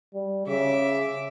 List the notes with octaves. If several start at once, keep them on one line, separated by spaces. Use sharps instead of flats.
G3
C#3 E5 D6